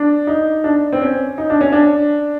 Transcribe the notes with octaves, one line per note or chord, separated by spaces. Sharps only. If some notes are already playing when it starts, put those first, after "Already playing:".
Already playing: D4
D#4
D4
C4
C#4
D#4
D4
C#4
D4